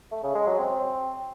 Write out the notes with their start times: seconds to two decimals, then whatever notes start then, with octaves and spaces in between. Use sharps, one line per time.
0.11 A3
0.23 C#3
0.35 G#3
0.47 F#3
0.59 C4